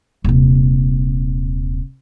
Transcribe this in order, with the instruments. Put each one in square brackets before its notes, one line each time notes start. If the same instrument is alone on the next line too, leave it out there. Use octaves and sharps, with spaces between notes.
[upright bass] D#1 C3